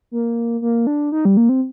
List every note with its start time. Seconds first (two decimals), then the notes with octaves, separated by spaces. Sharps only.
0.11 A#3
0.62 A#3
0.87 D4
1.12 D#4
1.25 G3
1.37 A#3
1.49 C4